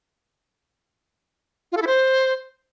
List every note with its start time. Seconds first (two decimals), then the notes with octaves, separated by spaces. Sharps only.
1.72 F4
1.77 A4
1.82 E4
1.87 C5